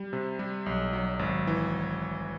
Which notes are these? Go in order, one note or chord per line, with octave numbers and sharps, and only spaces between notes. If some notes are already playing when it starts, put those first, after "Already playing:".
Already playing: G3
C3
G3
B1
F#3
G#1
E3